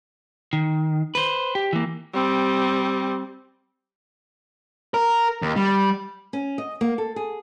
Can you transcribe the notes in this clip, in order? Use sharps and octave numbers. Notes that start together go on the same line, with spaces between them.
D#3
B4 C5
G4
E3 A#3
G3 C4
A#4
D#2
G3
C#4
D#5
A#3
A4
G#4